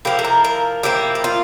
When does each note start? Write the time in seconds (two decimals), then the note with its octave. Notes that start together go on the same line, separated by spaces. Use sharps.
0.05 F3 A#3 E4 G4
0.19 A4
0.25 A#4
0.45 A#4
0.83 F3 A#3 E4 G4
1.15 G4
1.24 F4